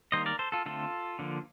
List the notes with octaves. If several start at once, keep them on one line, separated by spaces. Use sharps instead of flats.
D#3 G3 A#3 C5 D#5
A#4 D5
A4 C5
F4 A4
D3 A3 C4 F4 A4
D3 F3 A#3